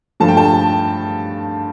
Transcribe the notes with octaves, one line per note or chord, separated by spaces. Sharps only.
G2 F3 A3 A5
G5
A5